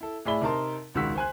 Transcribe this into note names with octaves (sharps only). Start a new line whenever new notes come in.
E4 A4
A2 G#4 D5 E5 B5 G7
C3 D#4 A#4 A5 C6
E1 C#2 D#3 F#4 E6 B6
C5 G#5 F#6